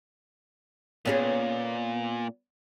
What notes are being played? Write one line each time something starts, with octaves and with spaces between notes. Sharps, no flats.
A#2 B3 C#4 G#4